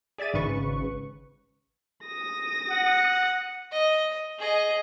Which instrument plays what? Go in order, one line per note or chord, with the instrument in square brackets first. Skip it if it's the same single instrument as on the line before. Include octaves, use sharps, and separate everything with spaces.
[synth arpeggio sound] G#4 D5 E5 A6 D#7
G#1 G#2 C#3 B4 C#6
[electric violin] D#6 A#6
[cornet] F#5
[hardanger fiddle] D#5
G#4 D#5